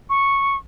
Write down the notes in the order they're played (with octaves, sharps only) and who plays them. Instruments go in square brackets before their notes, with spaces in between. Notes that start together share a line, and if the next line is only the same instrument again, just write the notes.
[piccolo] C#6